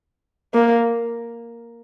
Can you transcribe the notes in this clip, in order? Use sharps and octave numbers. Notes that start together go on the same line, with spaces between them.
A#3